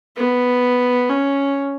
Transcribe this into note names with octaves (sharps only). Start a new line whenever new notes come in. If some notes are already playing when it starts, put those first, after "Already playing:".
B3
C#4